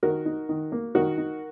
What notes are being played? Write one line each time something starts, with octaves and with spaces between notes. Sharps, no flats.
D#3 F#4 A#4
D#4
D#3
A#3
D#3 F#4 A#4
D#4